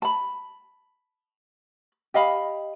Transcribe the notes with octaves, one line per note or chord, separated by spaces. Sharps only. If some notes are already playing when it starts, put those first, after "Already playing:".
A5 B5
G4 D#5 F5 B5